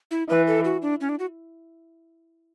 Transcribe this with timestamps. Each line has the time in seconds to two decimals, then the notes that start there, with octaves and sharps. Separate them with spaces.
0.11 E4
0.29 E3 B4
0.47 A4
0.65 F#4
0.82 D4
1.01 C#4
1.09 D4
1.19 F#4